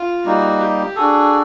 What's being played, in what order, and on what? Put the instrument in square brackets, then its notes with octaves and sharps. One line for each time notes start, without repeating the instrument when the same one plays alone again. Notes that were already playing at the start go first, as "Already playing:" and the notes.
Already playing: [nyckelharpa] F4
[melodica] G3 A#3 D#4 [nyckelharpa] F#4
[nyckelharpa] G4
[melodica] D4 F#4 A4 [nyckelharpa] G#4